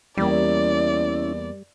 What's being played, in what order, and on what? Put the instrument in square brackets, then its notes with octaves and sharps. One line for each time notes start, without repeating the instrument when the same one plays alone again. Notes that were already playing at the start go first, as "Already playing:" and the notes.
[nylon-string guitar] E2 A#3 [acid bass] G3 [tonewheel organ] C#4 E4 [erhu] D5